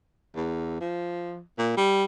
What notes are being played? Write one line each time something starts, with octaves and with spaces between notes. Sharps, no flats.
E2
F3
A#2
G3